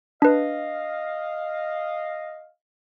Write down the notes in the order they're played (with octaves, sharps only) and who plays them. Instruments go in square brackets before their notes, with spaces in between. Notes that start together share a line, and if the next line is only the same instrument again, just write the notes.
[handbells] D4 B4 [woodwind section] D#5 F5